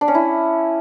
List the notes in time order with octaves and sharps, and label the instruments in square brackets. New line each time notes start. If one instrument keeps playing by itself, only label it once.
[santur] D4
C#4
E4